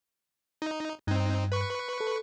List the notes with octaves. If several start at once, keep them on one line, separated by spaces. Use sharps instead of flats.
D#4
G2 C4 D#4
B4 C#6
A4